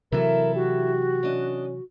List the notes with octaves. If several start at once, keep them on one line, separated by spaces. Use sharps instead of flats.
C3 E3 F#3 E4 A4 A#4
F#4 G4
C#4 D4 D#5